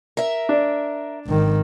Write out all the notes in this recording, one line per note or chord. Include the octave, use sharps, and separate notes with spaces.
A#4 E5
D4
G#1 D#3